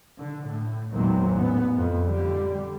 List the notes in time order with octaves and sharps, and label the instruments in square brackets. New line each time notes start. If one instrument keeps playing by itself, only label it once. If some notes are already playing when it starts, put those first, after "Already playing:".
[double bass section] D3
A2
G#1 E2 A#2 D#3 F#3 C4
A1 B3
F2
D3 G3